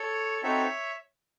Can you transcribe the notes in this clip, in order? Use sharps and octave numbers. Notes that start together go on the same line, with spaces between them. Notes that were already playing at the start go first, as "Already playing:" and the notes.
Already playing: A4 C#5
C4 D#4 F#4 A4 C#5 E5